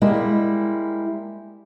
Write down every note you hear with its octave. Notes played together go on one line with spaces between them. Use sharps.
G3 G#3 A#3 E4